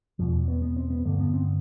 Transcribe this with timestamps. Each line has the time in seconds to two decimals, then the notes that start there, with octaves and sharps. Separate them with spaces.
0.19 E2 B2 F3
0.48 B3
0.62 B3
0.76 C4
0.90 B3
1.05 G2 D3 A3
1.20 B3
1.34 C4